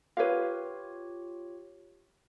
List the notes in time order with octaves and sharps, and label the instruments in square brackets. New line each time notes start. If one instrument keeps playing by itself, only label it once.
[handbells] F4 G4 C#5 [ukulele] B4 F5